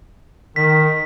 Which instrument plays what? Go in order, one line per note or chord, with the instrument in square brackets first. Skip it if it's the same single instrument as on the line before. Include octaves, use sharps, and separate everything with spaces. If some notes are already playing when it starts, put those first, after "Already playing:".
[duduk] D#3 [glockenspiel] B6